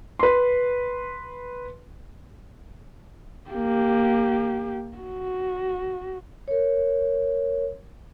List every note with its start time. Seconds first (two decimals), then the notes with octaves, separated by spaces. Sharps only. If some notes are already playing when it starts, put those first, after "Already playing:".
0.19 B4 C6
3.51 A#3 G4
4.97 F#4
6.48 A#4 C#5